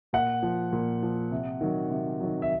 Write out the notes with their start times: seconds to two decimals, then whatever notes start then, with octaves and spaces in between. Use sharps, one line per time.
0.13 A#2 F#5
0.42 F3
0.72 A#2
1.03 F3
1.31 C3
1.61 D#3 F#3
1.90 C3
2.21 D#3 F#3
2.42 E5